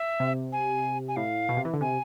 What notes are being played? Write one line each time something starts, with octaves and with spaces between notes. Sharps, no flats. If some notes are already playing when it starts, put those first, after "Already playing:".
Already playing: E5
C3
G#5
G#5
A2 F5
B2
C3
E3
D3
C3 G#5